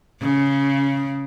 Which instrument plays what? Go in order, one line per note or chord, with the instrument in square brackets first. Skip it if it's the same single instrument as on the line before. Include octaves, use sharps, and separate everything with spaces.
[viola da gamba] C#3